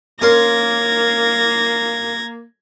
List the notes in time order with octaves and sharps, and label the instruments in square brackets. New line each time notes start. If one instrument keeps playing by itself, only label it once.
[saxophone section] A#3 [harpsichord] C#4 A#4 C6 [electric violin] G#6 A#6